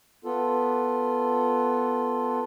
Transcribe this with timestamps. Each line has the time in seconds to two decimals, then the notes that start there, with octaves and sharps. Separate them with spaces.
0.25 B3 F4 A4